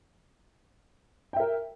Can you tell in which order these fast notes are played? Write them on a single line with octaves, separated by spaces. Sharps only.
G5 E5 A#4